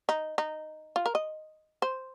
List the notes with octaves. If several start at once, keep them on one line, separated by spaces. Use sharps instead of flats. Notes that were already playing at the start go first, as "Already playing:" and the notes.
D#4
D#4
F4
A#4
D#5
C5